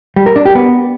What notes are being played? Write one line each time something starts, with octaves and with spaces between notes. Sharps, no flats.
G3
A#4
D4
G4
B3